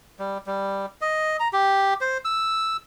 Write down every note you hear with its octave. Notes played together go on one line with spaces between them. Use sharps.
G3
G3
D#5
A#5
G4
C5
E6